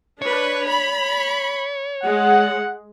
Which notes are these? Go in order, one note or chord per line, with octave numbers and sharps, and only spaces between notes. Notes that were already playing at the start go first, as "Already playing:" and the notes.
D4 B4 C#5
B5
G#3 F#5